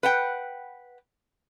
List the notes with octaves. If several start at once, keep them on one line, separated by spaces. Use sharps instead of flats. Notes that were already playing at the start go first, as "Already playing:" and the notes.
B4 F#5 G5